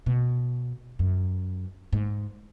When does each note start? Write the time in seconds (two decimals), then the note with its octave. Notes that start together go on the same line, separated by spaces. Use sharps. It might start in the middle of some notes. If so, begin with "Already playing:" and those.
0.06 B2
0.99 F#2
1.93 G#2